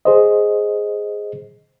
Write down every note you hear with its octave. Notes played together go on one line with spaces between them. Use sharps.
G#4 C5 D#5